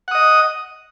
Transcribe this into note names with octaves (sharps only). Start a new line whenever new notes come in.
D#5 F#5 D#6